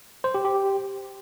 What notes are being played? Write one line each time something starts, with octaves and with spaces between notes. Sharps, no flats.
C5
G4
G4